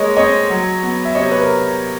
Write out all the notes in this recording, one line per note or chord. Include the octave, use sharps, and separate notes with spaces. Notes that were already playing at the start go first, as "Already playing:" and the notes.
Already playing: G#3 A#3 C#5 D#5
C4 C#5 D#5
F#3
B3
E5
C3 C#5 D#5
B4 C#5
A#4